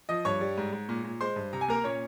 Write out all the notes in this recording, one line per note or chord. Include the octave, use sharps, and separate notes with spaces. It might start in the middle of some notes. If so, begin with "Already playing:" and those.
F3 D#5 D#6
G2 C#5 C#6
G3
G#2
G#2
A#2
A#2
G#3 C5 C6
G2
C3 A#5
G#5
A#3 A#4 A#5
A#2 C#4 C#5